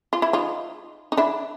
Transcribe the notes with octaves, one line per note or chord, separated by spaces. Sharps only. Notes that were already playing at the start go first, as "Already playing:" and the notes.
F4
E4
D#4 F4
D#4
D4 E4